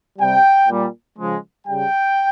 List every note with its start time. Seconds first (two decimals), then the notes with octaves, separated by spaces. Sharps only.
0.19 C3 G3 G5
0.69 A#2 G3
1.19 C#3 F3 G#3
1.68 C#3 G3 G5